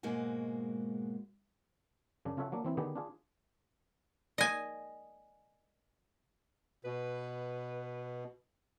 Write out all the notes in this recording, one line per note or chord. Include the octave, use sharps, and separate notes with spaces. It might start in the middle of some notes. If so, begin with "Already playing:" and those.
G#2 B2 G#3 A#3 F#4
F#2 C#3 D4
C#3 F4 A4 C#5 E5 F#5
F#3 A#3 D4
E3 C4 E4
D3 D#3 B3 G4 G#4
D4 F4 G#4
D#5 G#5
B2 B4